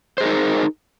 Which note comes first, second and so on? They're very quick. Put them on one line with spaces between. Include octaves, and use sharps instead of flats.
C5 G#4 A#4 D#4